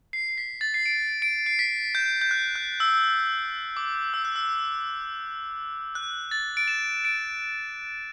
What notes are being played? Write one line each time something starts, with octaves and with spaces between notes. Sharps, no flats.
C7
C7
B6
A6
C7
D7
D7
C7
B6
G6
G6
F#6
F#6
E6
D6
E6
F#6
E6
F#6
A6
D7
E7
D7